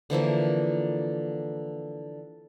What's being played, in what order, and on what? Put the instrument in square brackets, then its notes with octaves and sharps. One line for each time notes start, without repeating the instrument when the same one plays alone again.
[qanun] D3 E3 F3 A#3